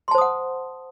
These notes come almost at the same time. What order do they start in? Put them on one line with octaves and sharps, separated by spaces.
C6 A5 C5 D#6 F#5